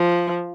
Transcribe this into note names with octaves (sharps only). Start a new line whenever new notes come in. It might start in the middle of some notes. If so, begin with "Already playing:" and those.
Already playing: F3